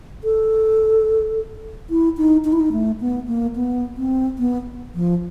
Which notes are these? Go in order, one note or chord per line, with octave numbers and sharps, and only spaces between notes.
A4
E4
D#4
D#4
E4
D#4
A3
B3
A#3
B3
C4
B3
F3